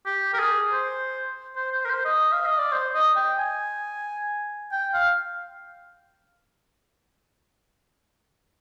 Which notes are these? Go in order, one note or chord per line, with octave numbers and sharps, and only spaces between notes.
G4
A#4
G#4
C5
C5
C5
A#4
C5
D#5
F5
D#5
D5
C5
D#5
G5
G#5
G5
F5